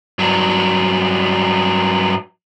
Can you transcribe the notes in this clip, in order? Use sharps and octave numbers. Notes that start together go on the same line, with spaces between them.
G2 F#3